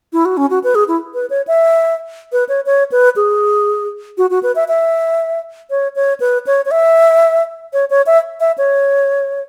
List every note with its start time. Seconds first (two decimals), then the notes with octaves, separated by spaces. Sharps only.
0.13 E4
0.25 F#4
0.37 C#4
0.50 F#4
0.64 B4
0.75 G#4
0.88 E4
1.14 B4
1.30 C#5
1.47 E5
2.32 B4
2.49 C#5
2.66 C#5
2.92 B4
3.16 G#4
4.18 F#4
4.30 F#4
4.43 B4
4.55 E5
4.68 E5
5.70 C#5
5.96 C#5
6.20 B4
6.47 C#5
6.65 C#5
6.71 E5
7.73 C#5
7.90 C#5
8.06 E5
8.40 E5
8.58 C#5